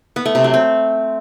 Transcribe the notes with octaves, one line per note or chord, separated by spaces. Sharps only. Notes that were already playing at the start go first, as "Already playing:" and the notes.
B3
A3
C3
F#3
C4